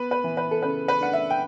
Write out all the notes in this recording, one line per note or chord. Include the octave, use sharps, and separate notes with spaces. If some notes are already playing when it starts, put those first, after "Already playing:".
Already playing: B3 B4
B4
E3
B4
A4
C#3 B4
B4
D4 F#5
E5
G5